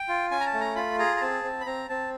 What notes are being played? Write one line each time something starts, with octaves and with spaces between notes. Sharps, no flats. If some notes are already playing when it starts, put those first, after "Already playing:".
Already playing: G5
F4
C#4 G#5
A#5
A5
A3
A#5
F4 B5
G#4 A#5
A#5
C4 A5
C4
B5
C4 A#5
C4 A5